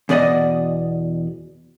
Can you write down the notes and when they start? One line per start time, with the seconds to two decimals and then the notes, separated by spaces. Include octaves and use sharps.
0.09 E2 B2 D5 D#5